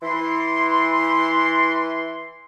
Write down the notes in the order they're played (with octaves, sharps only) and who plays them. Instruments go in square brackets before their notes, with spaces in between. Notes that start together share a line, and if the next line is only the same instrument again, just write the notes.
[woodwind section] E3 C6